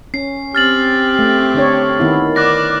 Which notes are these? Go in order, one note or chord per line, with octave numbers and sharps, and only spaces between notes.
C#4 C7
C4 G4 F6 A6 F#7
A3
D3 D4 C#5
D#3 B3 E4
D5 D6 F#6 A#6